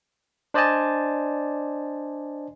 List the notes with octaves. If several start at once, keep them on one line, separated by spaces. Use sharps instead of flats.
D4 C5 D5 D#5 G#5 A5